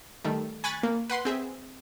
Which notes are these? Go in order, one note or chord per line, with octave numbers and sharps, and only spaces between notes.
D#3 G3 A3
G#5 B5 C#6 F#6 A6
A#3
B4 F#5 C6
C4 G#4 E5